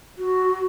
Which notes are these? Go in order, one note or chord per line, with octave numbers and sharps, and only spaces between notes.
F#4